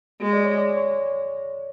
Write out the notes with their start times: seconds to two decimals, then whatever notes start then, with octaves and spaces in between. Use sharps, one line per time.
0.21 G#3
0.33 D5
0.45 C#5
0.58 D5
0.77 C#5